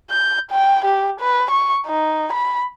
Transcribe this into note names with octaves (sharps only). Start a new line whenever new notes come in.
G6
G5
G4
B4
C#6
D#4
B5